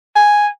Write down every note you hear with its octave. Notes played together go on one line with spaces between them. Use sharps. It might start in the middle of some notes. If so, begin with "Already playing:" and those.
G#5